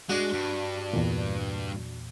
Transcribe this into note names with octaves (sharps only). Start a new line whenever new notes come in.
G#3 D4 F#4
G2
E2 A#2